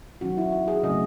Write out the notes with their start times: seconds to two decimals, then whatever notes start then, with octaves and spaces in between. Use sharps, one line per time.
0.21 D#3 F#3 C#4 F#4
0.37 E4
0.52 F#4
0.68 G#4
0.83 C#3 F#3 A3 C4 D#5